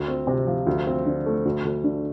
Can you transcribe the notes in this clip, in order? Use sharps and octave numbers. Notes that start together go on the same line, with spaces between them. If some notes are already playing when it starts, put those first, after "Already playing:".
Already playing: D2
C4
C3
F3
D2
C4
D3
A3
D2
D2
D3